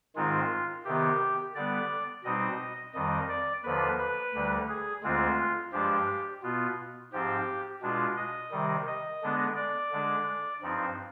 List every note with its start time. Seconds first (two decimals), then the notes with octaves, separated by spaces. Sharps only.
0.16 G#2 D#3 G#3 C4 D#4 F4
0.85 C3 D#3 B3 G4
1.55 D3 G3 B3 D5
2.24 B2 G3 C4 D#4 D#5
2.94 F2 D#3 G3 D#5
3.29 D5
3.64 D#2 D3 F3 B4
3.99 B4
4.33 D2 D3 G3
4.69 G#4
5.03 D2 D3 G#3 C4 F4
5.73 G2 F3 G#3 D4 G4
6.43 B2 B3 F4
7.12 G#2 F3 C4 G4
7.82 B2 G#3 D4 F4
8.16 D#5
8.51 C3 D#3 G3
8.87 D#5
9.22 D3 G#3 B3 D4
9.56 D5
9.91 D3 G#3 D4
10.62 G2 F3 C4 D#4